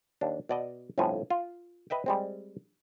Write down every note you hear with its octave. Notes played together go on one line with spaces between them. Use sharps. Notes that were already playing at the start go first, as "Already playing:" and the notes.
D#2 D4
B2 D5 D#5
G1 F2 A2 F3 G#5
F4
B4 D#5 E5 G5
G3 G#3 C4